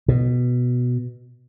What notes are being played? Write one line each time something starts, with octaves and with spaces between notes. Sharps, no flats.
B2